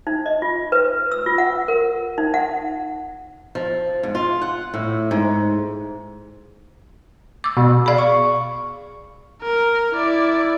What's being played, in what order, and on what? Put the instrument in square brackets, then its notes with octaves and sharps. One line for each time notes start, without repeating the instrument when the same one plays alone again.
[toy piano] D#4
D#5
F4
B4
E6
F4
F#5
A#4
D#4
F#5
[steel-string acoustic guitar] F3
G#2
F4
F#5
A2
G#2
[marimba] D6 E6
[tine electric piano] B2
[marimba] G#4 D5 [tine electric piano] F5 B5
[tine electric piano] C#6
[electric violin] A#4
E4 D5